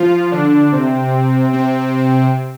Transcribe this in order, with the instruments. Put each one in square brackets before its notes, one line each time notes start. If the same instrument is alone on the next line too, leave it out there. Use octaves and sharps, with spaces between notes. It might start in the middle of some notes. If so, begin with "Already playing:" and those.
Already playing: [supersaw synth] F3 F4
D3 D4
C3 C4
C3 C4